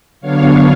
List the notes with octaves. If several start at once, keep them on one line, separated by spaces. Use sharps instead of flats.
D3 F#3 B3 D4 C#5 F5